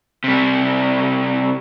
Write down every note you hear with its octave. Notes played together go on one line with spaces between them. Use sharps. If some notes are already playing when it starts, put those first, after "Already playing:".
C3 G3